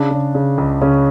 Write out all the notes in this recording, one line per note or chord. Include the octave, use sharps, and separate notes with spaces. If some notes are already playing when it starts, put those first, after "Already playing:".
Already playing: C#3 D4
C#3
C#3
C#2
C#3 C#4